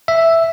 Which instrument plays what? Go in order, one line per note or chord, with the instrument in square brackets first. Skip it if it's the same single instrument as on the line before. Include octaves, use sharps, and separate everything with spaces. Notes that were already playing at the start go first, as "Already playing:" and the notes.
[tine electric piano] E5